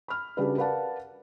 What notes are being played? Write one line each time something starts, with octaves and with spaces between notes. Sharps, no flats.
B5 F6
C#3 G3 D4 F#4 G#4 B4
A#4 B4 D5 F5 F#5 A5